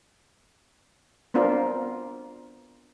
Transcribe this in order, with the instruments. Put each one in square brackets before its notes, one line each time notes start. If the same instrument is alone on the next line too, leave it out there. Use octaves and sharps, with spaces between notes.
[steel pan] B3 C4 D4 F4 A#4